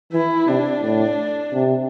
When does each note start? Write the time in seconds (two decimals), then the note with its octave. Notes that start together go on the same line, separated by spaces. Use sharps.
0.12 E3 E4
0.48 C3 D4
0.83 A2
1.53 C3